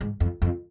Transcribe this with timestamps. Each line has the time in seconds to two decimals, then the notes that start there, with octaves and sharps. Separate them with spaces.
0.01 G#2
0.20 F2
0.42 F2